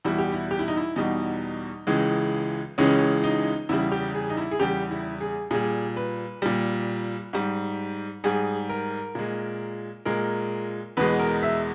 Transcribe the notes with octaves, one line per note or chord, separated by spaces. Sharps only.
E2 B2 G3 E4
G4
E4
G4
E4
D#4
E4
E2 B2 G3 D#4
C#2 C#3 E3 G#3
C#2 C#3 E3 G#3 C#4
D#4
E2 C#3 G3 E4
G4
G#4
D#4
E4
G#4
E2 C#3 G3 G4
E4
G#4
A#2 G3 G#4
B4
A#2 G3
G#2 G3
G#2 G3 G#4
A#4
A#2 G#3
A#2 G#3 A#4
E2 B2 G#3 B4
A#4
E5